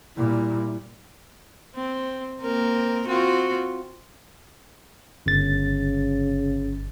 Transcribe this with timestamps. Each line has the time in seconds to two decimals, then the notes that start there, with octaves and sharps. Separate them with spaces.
0.16 A#2 G3 E4
1.75 C4
2.42 A#3 C4 A#4
3.08 C4 F4 F#4
5.26 G1 C#3 A6